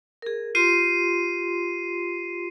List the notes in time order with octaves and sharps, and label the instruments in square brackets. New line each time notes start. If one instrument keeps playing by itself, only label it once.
[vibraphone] G#4 A#4
[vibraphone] F4 G4 C6 [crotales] C7 D#7